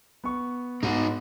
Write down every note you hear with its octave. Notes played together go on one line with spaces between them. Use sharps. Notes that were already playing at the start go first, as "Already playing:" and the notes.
B3 C#6
G#2 B3 D#4 F#4